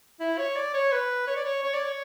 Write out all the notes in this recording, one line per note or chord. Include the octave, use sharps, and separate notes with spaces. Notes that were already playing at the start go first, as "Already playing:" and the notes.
E4
C#5
D5
C#5
B4
C#5
D5
C#5
C#5
D5
C#5